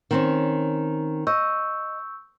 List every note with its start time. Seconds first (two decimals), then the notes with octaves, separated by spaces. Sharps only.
0.11 D#3 C4 C#4
1.27 D#5 C#6 E6 G6